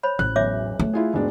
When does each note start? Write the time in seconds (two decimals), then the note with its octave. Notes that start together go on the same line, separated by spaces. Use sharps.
0.03 C5 C#5 B5
0.19 A1 F#6
0.36 E1 B1 C#5 E5 D6
0.79 A3
0.93 E4 F4 G#4
1.13 E1 G#2 D4